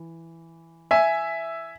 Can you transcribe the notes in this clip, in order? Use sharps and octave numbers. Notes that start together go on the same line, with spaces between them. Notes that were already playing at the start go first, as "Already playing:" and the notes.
Already playing: E3
E5 G#5